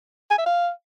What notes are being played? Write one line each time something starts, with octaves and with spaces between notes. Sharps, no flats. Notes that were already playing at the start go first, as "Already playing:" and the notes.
G#5
E5
F5